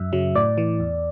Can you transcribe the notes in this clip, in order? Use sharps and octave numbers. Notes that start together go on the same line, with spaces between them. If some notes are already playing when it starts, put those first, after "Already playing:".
Already playing: F#2 E5
C#3 F#3
A2 D5
E3
E2